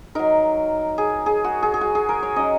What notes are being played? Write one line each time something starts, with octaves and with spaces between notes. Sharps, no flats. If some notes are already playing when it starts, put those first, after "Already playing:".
F#3 D#4 A#4
G#4
G#4
F#4
G#4
G#4
F#4
G#4
A#4
C#5
F#3 C#4 D#5